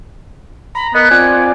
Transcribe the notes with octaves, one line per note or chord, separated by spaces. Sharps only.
A#5 B5
B3 A#4 D#5 F#6
C4 F4 D5 G#5